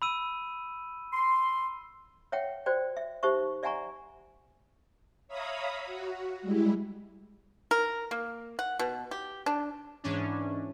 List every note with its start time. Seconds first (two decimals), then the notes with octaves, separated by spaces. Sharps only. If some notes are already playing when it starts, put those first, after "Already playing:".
0.02 B5 E6 D#7
1.13 C6
2.32 C#5 E5 F#5 G5
2.66 F#4 C5 D5 G5
2.97 E5
3.23 D#4 G4 C5 E5 C#6
3.63 D5 E5 F#5 G#5 A#5 C#6
5.28 C#5 E5 F5 A#5 B5 D#6
5.86 F#4
6.42 G3 G#3 E4
7.71 A#4
8.11 A#3
8.59 F#5
8.79 B2
9.11 G4
9.46 D4
10.04 G#2 E3 C#4 D4